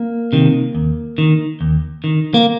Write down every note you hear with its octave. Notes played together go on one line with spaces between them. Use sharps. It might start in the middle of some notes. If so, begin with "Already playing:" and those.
Already playing: A#3
C3 D#3
D#2
D#3
D#2
D#3
A#3